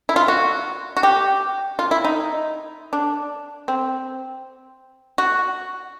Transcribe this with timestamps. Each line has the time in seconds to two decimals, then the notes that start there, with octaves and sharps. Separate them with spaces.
0.09 E4
0.16 F4
0.28 F#4
0.97 F#4
1.03 G4
1.79 F4
1.91 E4
2.04 D#4
2.93 D4
3.68 C4
5.18 F#4